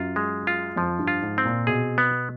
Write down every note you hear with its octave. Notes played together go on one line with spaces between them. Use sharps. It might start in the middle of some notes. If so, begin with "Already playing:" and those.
Already playing: F#2 F4
G#3
F4
F2 F3
G2
F4
G#2
C4
A#2
B2 G#4
B3